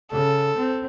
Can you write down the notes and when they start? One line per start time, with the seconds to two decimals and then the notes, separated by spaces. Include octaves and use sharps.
0.12 C#3 A4
0.57 C4